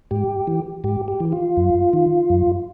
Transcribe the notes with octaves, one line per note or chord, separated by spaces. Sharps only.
G#2 G4
E3
G#2 G4
G4
E3
F4
F#2
D#3
F#2